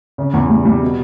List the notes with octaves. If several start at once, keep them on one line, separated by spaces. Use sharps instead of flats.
C#3
E2
G3
G3
B2